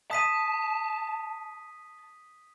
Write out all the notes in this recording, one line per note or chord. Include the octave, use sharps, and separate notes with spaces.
A5 D#6 B6 D#7